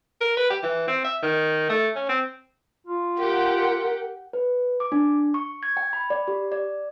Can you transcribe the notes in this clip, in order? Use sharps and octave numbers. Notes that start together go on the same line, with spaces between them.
A#4
B4
G4
E3
C4
E5
D#3
A3
C#4
C4
F4
G4 A#4 F#5 G5
B4
D6
D4
C#6
G#6
G5
B5
D5
G4
D5